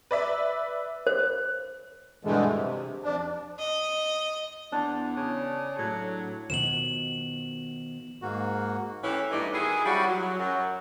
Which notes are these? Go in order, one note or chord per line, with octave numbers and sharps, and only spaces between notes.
B4 D5 E5
C5
G2 B2 D3 E3 G#3 A3
C3
F2 D4
D#5
E2 B3 D4
C#3
A2 F#3
B2 D#3 F3 E7 F#7
G#2 A#3 F#4
A2 E3 A3 C#4 E4 G4
E2 G2 E3 A3 D#4 D5
D#3 E4 F#4 G#4
F3 G3 C#4 E4 F#4
F#3
F#2 F#3